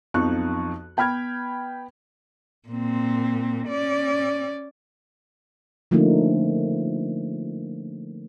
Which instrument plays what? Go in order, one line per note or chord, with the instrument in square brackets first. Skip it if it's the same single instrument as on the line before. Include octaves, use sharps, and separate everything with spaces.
[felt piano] B1 F2 F3 D#4 C#6 F#6
B3 G5 B5 F6 G#6
[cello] A#2 C4
C#4 D5
[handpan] D3 F3 A3 A#3 C#4 D#4